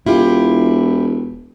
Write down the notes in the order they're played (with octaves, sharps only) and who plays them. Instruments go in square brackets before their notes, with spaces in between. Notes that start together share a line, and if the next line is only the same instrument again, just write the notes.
[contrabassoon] E1 [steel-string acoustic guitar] E4 F4 G4